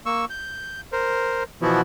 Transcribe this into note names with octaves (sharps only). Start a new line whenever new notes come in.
A#3 C#6 E6
G6
A#4 C5
B2 E3 F3 B3 E4 F#4